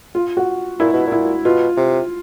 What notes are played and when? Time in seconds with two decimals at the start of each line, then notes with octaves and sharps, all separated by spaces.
0.15 F4
0.37 F#4
0.79 A#2 E4
0.93 B2
1.07 A#2
1.12 E4
1.45 B2 F4
1.77 C3